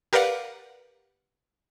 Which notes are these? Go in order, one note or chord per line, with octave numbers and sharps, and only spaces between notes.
G4 A#4 B4 D5 F5 F#5